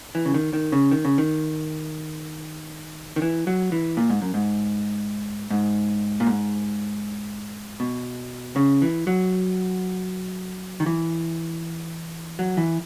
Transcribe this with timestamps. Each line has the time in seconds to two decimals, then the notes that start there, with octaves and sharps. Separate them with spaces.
0.15 E3
0.25 C#3
0.34 D#3
0.53 D#3
0.72 C#3
0.91 D#3
1.05 C#3
1.18 D#3
3.16 D#3
3.22 E3
3.47 F#3
3.72 E3
3.97 A#2
4.09 G#2
4.22 F#2
4.34 G#2
5.50 G#2
6.20 A#2
6.27 G#2
7.80 B2
8.56 C#3
8.82 E3
9.07 F#3
10.80 D#3
10.86 E3
12.39 F#3
12.57 E3